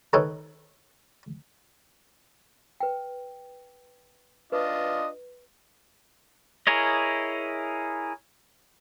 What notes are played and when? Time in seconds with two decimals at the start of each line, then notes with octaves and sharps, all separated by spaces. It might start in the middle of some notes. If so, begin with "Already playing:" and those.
0.13 D#3 A4 B4 C#5 A#5
2.80 B4 G5
4.52 D4 F4 B4 D#5
6.67 E4 G#4 A#4 C#5 D#5